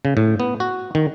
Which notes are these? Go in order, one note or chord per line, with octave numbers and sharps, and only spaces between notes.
C#3
A2
B3
F#4
D#3